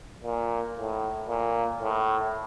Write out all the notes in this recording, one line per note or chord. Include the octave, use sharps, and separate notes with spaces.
A#2
A2
A#2
A2